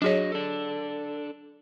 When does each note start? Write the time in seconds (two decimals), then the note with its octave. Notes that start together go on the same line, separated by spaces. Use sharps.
0.02 F#3 D4 F#4 G#4 C#5 D#5
0.32 D4 A4